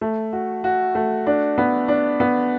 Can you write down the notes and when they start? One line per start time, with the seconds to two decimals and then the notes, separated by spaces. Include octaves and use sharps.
0.01 A3
0.33 F#4
0.64 F#4
0.95 A3
1.27 D4
1.58 B3
1.88 D4
2.20 B3